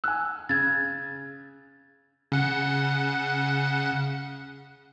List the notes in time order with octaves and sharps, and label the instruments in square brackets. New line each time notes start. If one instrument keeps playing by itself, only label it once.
[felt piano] G#5 E6 [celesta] F#6
[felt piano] C#3 [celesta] G#6 A6
[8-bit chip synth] C#3 F#5